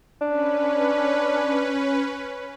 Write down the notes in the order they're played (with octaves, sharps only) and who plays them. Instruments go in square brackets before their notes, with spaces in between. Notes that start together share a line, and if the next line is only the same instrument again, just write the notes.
[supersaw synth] C#4 B4 [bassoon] D4